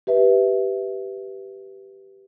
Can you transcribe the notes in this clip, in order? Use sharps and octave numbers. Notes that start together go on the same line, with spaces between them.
G4 B4 E5